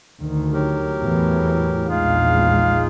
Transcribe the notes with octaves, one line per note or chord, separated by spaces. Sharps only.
D2 D#3
F#3 G4 A#4
E2 A2 E3
A#1 E2 G#3 D#4 F4 G#4 F5